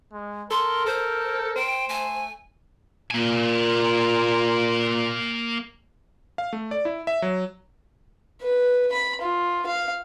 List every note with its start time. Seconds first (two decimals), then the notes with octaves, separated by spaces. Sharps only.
0.12 G#3
0.51 A4 A#4 C6
0.86 A4 C5
1.56 C5 G5
1.89 A3 G#5
3.11 A#2 A#3 G#5
6.38 F5
6.53 A3
6.71 D5
6.85 E4
7.07 E5
7.22 F#3
8.42 B4
8.92 B5
9.22 F4
9.67 F5